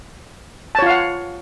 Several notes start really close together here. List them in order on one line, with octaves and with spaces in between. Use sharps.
A5 C#5 F4 F5 F#5